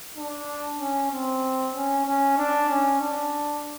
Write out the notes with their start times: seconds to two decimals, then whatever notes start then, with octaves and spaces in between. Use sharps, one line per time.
0.17 D4
0.79 C#4
1.11 C4
1.74 C#4
2.06 C#4
2.37 D4
2.69 C#4
3.00 D4